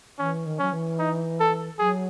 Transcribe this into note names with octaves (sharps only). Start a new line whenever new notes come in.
E3 C#4
D#3
F#3 C#4
E3
D#4
A4
F#3 G#4